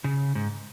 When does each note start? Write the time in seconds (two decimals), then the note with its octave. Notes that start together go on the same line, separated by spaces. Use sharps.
0.04 C#3
0.35 G#2